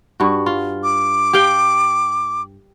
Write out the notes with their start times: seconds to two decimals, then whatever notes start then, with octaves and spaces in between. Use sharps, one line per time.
0.20 G2 F#4
0.46 F4
0.83 D6
1.33 G4 F5 G5